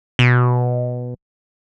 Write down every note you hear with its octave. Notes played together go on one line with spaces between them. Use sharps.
B2